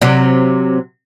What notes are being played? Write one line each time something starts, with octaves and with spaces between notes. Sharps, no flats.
C3 F#3